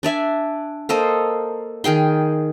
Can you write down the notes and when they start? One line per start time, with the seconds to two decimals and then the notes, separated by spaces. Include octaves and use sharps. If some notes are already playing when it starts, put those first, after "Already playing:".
0.03 D4 D5 E5 G#5
0.89 A#3 A4 C5 D#5
1.84 D#3 G#4 G5 C6